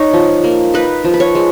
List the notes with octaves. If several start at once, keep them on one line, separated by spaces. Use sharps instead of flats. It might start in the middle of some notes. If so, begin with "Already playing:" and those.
Already playing: D#4 C#5
F3
A#3
D#4 B4
F3
B4
C#5
G#3